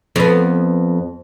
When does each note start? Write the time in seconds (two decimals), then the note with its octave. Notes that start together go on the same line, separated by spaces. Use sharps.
0.16 F2 B3